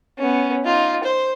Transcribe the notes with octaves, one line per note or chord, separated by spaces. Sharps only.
B3 C#4
D#4 F4
C5